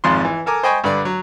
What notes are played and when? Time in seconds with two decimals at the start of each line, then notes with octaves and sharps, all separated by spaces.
0.04 G#1 F2 G#2 F4 C6
0.25 E3
0.46 A4 A#4 G#5 D6
0.63 C5 D#5 G5 G#5 B5 C#6
0.84 G2 D3 B4 D5
1.05 F#3